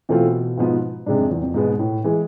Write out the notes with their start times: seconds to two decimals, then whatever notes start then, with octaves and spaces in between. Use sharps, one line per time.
0.09 B2 E3 A3 C4 F4
0.58 G#2 F3 B3
1.06 G#2 C3 G#3 D4
1.19 F2
1.31 E2
1.43 F2
1.54 G#2 B2 G#3 B3
1.79 A2
2.04 E3 G#3